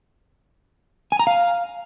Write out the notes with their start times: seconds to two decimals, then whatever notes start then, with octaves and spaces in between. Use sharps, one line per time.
1.12 G#5
1.19 A#5
1.27 F5